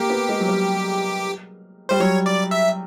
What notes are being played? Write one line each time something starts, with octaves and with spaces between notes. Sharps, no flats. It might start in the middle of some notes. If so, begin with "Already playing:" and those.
Already playing: A#3 G4
B3
G#3
F#3
G3
G3 C5
F#3 C#5
D5
E5